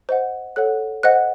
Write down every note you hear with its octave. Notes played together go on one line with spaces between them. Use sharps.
C5 D#5 F#5
A4 C#5 F#5 F#6
C5 D#5 F#5 F#6